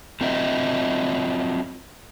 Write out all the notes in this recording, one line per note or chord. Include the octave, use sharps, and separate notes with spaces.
F#3 C4 F4 A#4 D#5 E5